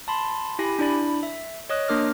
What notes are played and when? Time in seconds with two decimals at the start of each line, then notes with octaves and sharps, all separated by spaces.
0.08 A5 B5 C6
0.59 E4 G4 G#5 B5 A#6
0.79 D4 E4 D5 B5
1.23 E5
1.69 C#5 D#5 D#6 F#6
1.88 A#3 D4 A#4 D6 F6 A#6